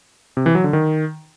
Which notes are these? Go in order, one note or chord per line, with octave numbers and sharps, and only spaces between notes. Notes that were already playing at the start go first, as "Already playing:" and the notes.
C3
E3
F#3
D3
D#3